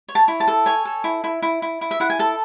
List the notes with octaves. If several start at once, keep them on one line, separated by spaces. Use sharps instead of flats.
C#5
A5
E4
A5
A4
C#5 G#5
A4
E4
E4
E4
E4
E4
E5
E4 F#5
G#5
A4 A5